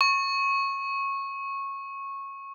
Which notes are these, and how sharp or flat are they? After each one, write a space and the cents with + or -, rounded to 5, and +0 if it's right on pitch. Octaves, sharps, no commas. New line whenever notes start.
C#6 -20